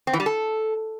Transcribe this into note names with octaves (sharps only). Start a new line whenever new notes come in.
C4
E3
G3
A4